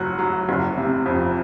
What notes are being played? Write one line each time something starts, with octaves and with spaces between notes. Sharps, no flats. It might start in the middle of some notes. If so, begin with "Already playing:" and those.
Already playing: F#1 F#3 F#5
F#3
F#1
C3
F2